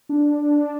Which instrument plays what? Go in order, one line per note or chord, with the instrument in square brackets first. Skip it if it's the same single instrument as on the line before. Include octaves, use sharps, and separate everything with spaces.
[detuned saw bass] D4